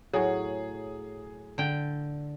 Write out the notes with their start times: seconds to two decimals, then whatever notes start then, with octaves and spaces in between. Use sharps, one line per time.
0.14 A2 F#3 G#4
1.58 D3 G5